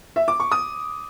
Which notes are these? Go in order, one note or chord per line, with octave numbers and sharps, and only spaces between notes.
E5
D6
C#6
D#6